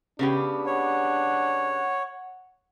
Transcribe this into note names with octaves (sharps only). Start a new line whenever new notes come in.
C#3 B3 D4 G4
C#5 F#5